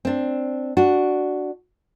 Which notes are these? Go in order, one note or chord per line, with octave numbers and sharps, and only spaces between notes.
C4 D4
D4 F#4